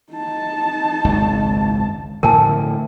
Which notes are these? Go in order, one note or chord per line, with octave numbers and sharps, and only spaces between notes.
D#4 A5
G#1 C#2 F#2
A2 D3 F3 A#4 G#5 A5